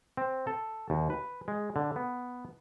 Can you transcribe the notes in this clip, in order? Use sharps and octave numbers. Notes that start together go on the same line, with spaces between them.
C4
A4
D#2
B4
G#3
D3
B3